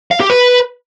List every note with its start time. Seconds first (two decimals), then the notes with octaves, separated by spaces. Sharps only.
0.11 F5
0.20 G4
0.30 B4